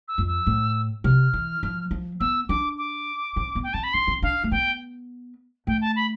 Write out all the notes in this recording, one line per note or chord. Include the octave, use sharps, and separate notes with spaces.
E6
F2
E6
A2
C3 F6
E3
F3
F3
B3 E6
D4 D6
D6
C4
B3
G5
C4 A5
B5
D4 C6
C4
D4 F5
A3
B3 G5
A3 G5
A5
B5